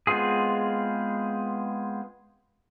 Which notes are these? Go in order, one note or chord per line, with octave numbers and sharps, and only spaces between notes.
G#3 B3 C4 F4 G#4